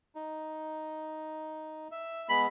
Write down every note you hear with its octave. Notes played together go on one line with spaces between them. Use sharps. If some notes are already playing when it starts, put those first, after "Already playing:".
D#4
E5
G#3 B3 B5